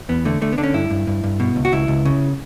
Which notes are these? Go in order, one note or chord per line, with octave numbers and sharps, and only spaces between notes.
E2 B3
D3 A3
D3 A3
B3
D3 D4
C#4
G2 E4
G2
G2
G2
B2
C#2
F#4
C#2 E4
C#2
C#3